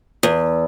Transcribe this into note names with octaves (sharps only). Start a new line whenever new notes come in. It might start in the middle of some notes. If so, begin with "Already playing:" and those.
E2